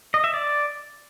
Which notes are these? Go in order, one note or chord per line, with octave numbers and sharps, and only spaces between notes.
D#5
E5
D5